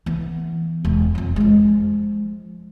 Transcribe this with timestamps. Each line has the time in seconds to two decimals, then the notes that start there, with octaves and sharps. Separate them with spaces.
0.06 E3 B3
0.85 E1
1.15 F2 F3
1.36 F3 G#3